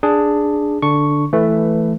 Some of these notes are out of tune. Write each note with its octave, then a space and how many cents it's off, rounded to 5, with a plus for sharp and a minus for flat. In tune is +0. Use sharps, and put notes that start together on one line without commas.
D4 +5 G#4 +0
D3 +0 D4 +0 C#6 +0
E3 +5 A3 +0 B4 +15